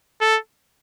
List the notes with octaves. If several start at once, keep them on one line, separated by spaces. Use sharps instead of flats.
A4